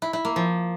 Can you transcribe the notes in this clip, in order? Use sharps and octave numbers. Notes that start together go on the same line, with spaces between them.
E4
E4
A#3
F3